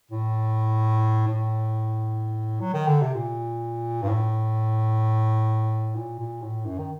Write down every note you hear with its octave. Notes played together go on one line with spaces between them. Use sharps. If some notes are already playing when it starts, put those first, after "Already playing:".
A2
A2
F#3
D#3
D3
C3
A#2
G2
A2
A#2
A#2
A2
F#2
D#3